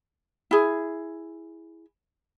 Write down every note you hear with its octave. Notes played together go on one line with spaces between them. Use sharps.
E4 G#4